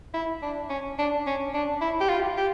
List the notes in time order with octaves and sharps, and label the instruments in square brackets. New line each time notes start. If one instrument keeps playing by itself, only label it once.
[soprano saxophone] E4
D4
C#4
D4
C#4
D4
E4
G4
F4
G4